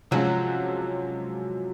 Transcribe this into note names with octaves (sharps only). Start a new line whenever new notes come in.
C3 F3 F#3 G#3 C#4 F4